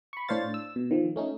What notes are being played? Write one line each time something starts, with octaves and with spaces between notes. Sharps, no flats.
B5 C#6
A2 D4 C5 C#5 F5 A6
E6
B2
D#3 F3
A3 C#4 D#4